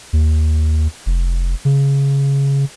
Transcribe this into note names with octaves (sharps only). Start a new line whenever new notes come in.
D#2
F1
C#3